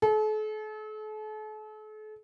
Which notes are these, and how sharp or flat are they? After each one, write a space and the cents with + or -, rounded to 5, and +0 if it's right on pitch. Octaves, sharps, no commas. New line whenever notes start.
A4 -40